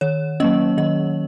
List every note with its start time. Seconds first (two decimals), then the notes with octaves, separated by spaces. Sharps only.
0.01 D#3 C#5
0.40 F#3 A#3 C#4 D#5
0.78 D#3 D#5